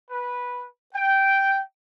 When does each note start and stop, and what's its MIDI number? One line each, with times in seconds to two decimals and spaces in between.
0.11 0.66 71
0.95 1.61 79